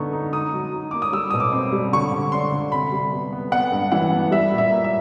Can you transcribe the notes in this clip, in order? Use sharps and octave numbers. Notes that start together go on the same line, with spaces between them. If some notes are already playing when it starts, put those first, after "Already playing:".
Already playing: D3 B3 D#4 C#6
D#4
D#4 D#6
F#3
D#4
A#3 D6
D#6
G3 E6
B2 D#6
D6
C4
G3
D3 C#6
D3
D4 C6
D3
C3 B5
G3
B3
B3
B3 F#5
G2
E3 F#5
B3
G3 E5
A#2
E5
A#3
E5